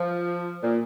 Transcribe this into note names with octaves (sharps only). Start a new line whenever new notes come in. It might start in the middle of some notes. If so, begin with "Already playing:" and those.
Already playing: F3
A#2